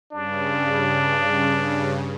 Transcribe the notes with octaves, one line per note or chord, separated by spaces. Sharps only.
G2 C#3 D4